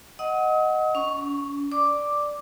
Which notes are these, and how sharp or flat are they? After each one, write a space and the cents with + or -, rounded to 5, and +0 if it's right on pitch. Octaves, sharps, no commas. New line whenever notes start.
D#5 +0 F#5 +0 D#6 +40
C#4 +40 C#6 +0
D5 +0 D6 +0